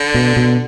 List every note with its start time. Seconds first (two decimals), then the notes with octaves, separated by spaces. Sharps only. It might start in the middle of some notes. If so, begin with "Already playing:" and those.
Already playing: D3
0.14 B2
0.37 B2